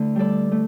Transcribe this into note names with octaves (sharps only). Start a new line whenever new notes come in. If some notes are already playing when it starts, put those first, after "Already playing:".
Already playing: D3 A3 E4 B4
G3 D4 A4 D5
A3